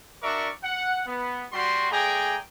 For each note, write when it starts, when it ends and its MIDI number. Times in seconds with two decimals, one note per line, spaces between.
0.23 0.50 62
0.23 0.50 66
0.23 0.50 70
0.23 0.50 74
0.23 0.50 76
0.23 0.50 85
0.63 1.01 78
1.07 1.46 59
1.53 1.90 55
1.53 1.90 66
1.53 1.90 84
1.91 2.37 57
1.91 2.37 68
1.91 2.37 74
1.91 2.37 79
1.91 2.37 80
1.91 2.37 82